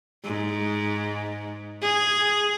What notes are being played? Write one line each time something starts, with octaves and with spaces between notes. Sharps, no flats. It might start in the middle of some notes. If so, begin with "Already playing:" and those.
G#2
G#4